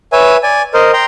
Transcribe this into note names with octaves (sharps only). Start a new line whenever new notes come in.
B4 C#5 E5 G#5
D5 G#5
A#4 C5 D#5
G5 A#5 C6